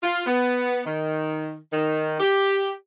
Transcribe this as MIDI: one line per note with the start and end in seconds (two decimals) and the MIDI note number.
0.03 0.24 65
0.26 0.81 59
0.86 1.56 51
1.73 2.20 51
2.20 2.73 67